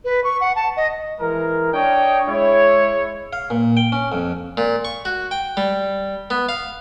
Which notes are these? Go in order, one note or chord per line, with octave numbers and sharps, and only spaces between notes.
B4
C#6
F#5
A5
D#5
E3 G#3 A#4
D4 C#5 D#5 G5
G#3 E4 C#5
F5
A#2
G5
C#4
F2
A#2
C#6
F#4
G5
G3
B3
F5